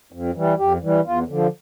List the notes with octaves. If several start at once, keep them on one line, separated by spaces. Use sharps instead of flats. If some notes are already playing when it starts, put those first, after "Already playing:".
F2
E3 G3
F2 G4
E3 G3
E2 F4
D3 F3